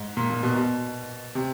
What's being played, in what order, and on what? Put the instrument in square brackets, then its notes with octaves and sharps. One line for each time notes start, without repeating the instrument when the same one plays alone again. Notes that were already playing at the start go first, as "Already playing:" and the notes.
Already playing: [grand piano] G#2
A#2
A#2
B2
B2
C3